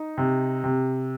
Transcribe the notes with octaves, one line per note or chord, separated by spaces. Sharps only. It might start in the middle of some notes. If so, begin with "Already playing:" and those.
Already playing: D#4
C3
C3